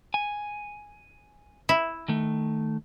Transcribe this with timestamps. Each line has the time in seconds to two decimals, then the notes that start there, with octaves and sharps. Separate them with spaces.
0.14 G#5
1.69 E4
2.08 D#3 A3